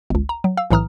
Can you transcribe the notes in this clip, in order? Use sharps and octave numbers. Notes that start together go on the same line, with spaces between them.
G1 C#2
A#5
F#3
F5 E6
B1 A2 E3 A#5 D#6 F6